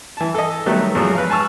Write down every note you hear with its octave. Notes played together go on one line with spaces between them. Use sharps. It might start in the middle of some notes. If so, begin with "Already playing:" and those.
E3 A5
A4 D#5
D#3 F#3 G3 A3 B3 D#4
E2 G#2 F3 F#3
B4 F5
G#5 A5 C#6 E6 F6